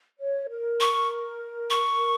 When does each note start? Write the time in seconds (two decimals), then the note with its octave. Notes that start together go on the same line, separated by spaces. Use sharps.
0.19 C#5
0.49 A#4
0.80 C#6
1.70 C#6